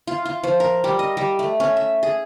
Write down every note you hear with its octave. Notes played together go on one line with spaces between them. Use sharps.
F4
F4
F3
A#4
G3
D#5
G3
A3
C#4
E5
G#4